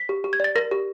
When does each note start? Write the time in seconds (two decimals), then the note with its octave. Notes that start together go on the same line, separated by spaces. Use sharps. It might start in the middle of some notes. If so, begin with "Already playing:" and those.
Already playing: B6
0.09 G4
0.24 G4
0.33 G#6
0.40 D5 A6
0.56 A#4 A#6
0.71 G4